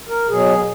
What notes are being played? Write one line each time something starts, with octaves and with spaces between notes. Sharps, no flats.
A#4
B2 F#3 G#4